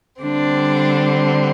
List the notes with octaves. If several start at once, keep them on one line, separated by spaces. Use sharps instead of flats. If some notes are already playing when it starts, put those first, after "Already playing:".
D3 G3 C4 D4